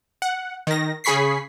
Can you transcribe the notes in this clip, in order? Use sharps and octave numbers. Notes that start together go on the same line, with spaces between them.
F#5
D#3 A#6
C#3 G#4 B5 C#6 B6 C7